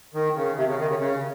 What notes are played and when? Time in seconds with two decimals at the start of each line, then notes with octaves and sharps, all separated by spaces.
0.14 D#3
0.36 C#3
0.57 C3
0.67 C#3
0.79 D#3
0.89 C#3
0.99 C#3